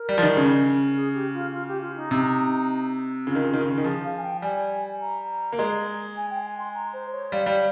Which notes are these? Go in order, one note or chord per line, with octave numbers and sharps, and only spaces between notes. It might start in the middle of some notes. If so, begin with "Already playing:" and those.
Already playing: A#4
G3
F3
D#3
C#3
G#4
G4
F4
F4
G4
F4
D#4
C3
C#3 F4
D#3
C#3
D#3
C#3
D#3
F3 G#4
F5
G#5
G5
G3 G#5
A#5
A#3
G#3
G#5
G5
G#5
C6
A#5
C5
C#5
G3 F5
G3